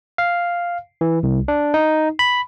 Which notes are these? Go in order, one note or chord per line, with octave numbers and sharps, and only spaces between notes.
F5
E3
C2
D4
D#4
B5